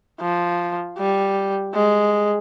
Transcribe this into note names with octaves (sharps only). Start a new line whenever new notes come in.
F3
G3
G#3